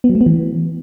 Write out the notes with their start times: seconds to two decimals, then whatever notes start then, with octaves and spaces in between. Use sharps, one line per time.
0.04 B3
0.10 F#3
0.15 A3
0.21 B3
0.26 E3